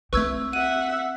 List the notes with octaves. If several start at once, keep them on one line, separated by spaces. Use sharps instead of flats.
A3 C4 E4 B4 C#6 E6 G#6
E5 F#5 D#7